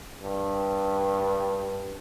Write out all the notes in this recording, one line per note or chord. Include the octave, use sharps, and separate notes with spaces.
G2